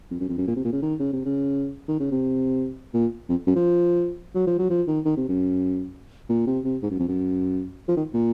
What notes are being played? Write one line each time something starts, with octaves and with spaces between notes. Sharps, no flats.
F2
F#2
F2
F#2
A#2
C3
A#2
C#3
D#3
C#3
C3
C#3
D#3
C#3
C3
A#2
F2
F#2
F3
F#3
F3
F#3
F3
D#3
D#3
C3
F#2
A#2
C3
C3
G#2
F#2
F2
F#2
F3
D#3
A#2